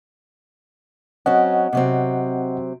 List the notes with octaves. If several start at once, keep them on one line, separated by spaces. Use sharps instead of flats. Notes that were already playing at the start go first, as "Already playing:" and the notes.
F#3 C4 C#4 D#5 F#5
C3 F#3 C4